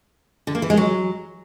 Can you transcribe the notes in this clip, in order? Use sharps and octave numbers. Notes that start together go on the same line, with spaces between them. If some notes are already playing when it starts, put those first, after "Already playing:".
D3
A#3
E3
G#3
F#3